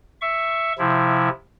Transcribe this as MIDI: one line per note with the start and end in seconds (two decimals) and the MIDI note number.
0.21 0.73 76
0.21 0.73 85
0.79 1.29 48
0.79 1.29 53
0.79 1.29 64